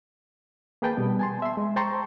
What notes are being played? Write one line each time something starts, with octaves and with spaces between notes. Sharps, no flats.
A#3 G#4 B4 G5 A5
B2 G3 B3
G#5 A5 C6
E5 C6
G#3
C5 G5 A5 A#5 C6 C#6